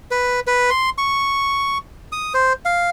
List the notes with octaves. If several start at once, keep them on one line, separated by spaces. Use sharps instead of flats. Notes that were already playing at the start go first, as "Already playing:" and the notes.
B4
B4
C6
C#6
D#6
C5
F5